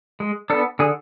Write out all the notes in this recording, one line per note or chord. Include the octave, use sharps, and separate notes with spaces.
G#3
B3 D4 A4
D3 G#4